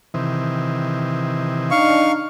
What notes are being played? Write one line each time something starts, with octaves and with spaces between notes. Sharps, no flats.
C3 D#3 E3
D4 D#4 F5 C#6